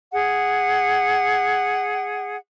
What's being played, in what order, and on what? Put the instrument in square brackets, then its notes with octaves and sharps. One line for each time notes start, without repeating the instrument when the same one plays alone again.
[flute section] G#4 F#5